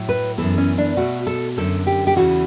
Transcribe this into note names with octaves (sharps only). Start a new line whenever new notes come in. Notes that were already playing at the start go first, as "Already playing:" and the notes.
Already playing: A2 F#3 A3
B4
F#2 E3 B3 A4
C#4
D4
B2 A3 F#4
A4
F#2 D3 A3 A4
G4
G4
E2 C#3 E3 F#4